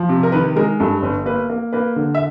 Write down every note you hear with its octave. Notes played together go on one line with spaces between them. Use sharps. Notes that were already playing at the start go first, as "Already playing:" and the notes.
Already playing: F3
C3
A#4
D#3 B4
G#3 A#4
G2 A4
G1 B4
A#3 B4
A#3
A#3 B4
D3
E5